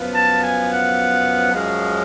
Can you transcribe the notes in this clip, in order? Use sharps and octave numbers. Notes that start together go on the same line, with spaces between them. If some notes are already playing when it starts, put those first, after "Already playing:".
Already playing: F#2 F3 B3 F4
A5
G#5
F#5
F#2 F3 G#3 C#4 F5